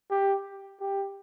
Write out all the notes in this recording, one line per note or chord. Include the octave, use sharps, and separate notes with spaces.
G4
G4